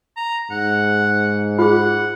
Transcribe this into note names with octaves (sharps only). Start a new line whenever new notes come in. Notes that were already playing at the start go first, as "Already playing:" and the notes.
A#5
G#2 F#5
F4 G#4 F#5